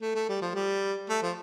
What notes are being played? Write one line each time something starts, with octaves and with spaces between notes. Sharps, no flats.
A3
A3
G3
F3
G3
A3
F3